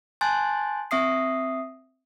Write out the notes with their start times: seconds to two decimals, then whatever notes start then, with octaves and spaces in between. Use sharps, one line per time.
0.21 G#5 A5 C6 F#6 G6 A6
0.91 C4 E5 D#6 C7